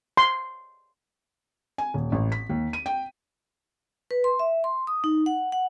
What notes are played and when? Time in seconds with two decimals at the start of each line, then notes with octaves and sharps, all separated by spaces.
0.17 C6
1.78 G#5
1.94 D#1
2.12 A1
2.32 B6
2.49 D#2
2.73 D#7
2.86 G5
4.11 B4
4.24 C6
4.39 E5
4.64 C6
4.87 D#6
5.04 D#4
5.26 F#5
5.52 F#5